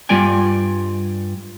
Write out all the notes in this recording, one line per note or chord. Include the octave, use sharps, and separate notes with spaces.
G2 G3 F4 D5 G5 G#5